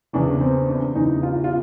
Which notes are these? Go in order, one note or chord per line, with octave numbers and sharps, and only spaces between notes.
E2 C#3 E3 D4
C4
D4
E2 C#3 E3 D#4
F4
F4